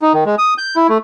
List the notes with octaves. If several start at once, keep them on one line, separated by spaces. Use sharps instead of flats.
D#4
D#3
G#3
D#6
G6
E4
A3